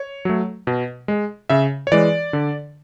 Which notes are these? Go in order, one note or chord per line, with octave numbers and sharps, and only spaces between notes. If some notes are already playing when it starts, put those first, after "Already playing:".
Already playing: C#5
F#3 A3
B2
G#3
C#3 E5
C#5
E3 G#3 D5
D3